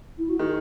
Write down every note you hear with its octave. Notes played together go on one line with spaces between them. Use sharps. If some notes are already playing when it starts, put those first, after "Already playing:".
E4
F#4
D#3 G#4